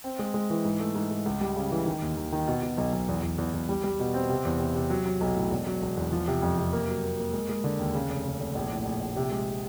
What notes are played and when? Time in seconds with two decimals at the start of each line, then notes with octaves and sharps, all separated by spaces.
0.04 C4
0.19 G#3
0.34 G#3
0.50 E3
0.65 G#2
0.80 A3
0.95 G#2
1.11 G#2
1.25 C#2
1.41 G3
1.56 C#3
1.72 E3
1.86 D#3
2.02 D#2
2.17 D#2
2.32 D#3
2.48 B2
2.63 B2
2.78 B1
2.93 B1
3.08 E2
3.23 E2
3.38 E2
3.54 E2
3.69 G3
3.84 G3
3.99 B2
4.14 C4
4.30 C3
4.45 E2
4.60 C3
4.75 C3
4.90 F#3
5.06 F#3
5.21 B1
5.35 A2
5.51 E1
5.67 F#3
5.82 E1
5.97 E2
6.12 F3
6.28 C3
6.42 F2
6.58 C3
6.73 A#3
6.88 F#3
7.03 A#3
7.18 A#3
7.33 G#3
7.49 G#3
7.64 D3
7.79 D#2
7.95 C#3
8.10 F1
8.24 C#3
8.40 F1
8.55 A#1
8.70 A2
8.85 A#1
9.01 A#1
9.16 C3
9.31 G#3